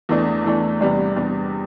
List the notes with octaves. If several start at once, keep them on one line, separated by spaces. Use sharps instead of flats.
E2 E3 A3 D4
E2 E3 A3 D4
E2 C3 G3 D4
E2 C3 G3 D4